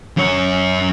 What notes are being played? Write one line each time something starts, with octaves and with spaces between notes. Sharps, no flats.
F#2 C#5